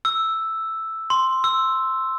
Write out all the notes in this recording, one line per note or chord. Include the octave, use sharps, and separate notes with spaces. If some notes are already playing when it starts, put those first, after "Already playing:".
E6
C6
E6